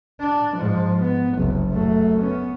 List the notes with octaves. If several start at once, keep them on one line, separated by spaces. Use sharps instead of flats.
D4
G#2 F3
B3
F#1 C2
F#2 A3
B3 C#4